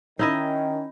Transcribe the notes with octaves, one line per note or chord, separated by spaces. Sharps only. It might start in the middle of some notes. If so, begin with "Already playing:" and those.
D#3 C#4 D#4 E4 D#5